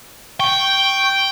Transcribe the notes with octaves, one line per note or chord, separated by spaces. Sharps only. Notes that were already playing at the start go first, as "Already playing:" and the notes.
G5 C#6